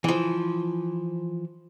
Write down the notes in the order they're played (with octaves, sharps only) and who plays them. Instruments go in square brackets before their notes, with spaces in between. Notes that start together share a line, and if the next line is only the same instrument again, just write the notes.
[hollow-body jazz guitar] E3 F3